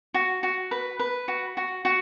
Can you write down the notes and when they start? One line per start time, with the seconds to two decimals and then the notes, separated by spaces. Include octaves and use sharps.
0.14 F#4
0.43 F#4
0.71 B4
0.99 B4
1.28 F#4
1.57 F#4
1.85 F#4